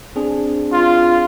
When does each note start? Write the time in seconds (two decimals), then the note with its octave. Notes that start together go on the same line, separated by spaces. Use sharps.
0.16 C4 D4 G#4
0.72 F4